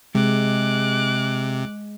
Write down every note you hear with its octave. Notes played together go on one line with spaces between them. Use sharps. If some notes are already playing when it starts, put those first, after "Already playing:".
C3 G#3 D6 F#6